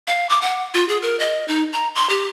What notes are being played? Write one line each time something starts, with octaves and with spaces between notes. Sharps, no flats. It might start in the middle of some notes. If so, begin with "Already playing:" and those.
F5
D6
F#5
F4
G#4
A#4
D#5
D#4
A#5
C6
G4